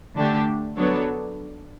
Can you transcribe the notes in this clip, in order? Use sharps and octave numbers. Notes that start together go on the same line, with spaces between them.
D3 A3 D4 G4
F#3 B3 D4 A4 C#5